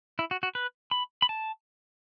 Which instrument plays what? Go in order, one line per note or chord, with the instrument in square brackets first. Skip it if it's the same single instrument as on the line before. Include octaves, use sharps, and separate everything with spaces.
[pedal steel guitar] E4
F#4
F#4
B4
B5
B5
A5